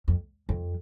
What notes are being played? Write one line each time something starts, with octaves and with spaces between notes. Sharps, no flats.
F2
F2